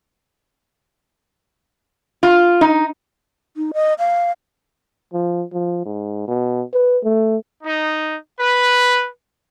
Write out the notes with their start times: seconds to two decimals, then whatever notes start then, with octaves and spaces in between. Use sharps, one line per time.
2.23 F4
2.61 D#4
3.57 D#4
3.74 D#5
3.99 F5
5.13 F3
5.53 F3
5.85 G#2
6.28 B2
6.73 B4
7.04 A3
7.62 D#4
8.39 B4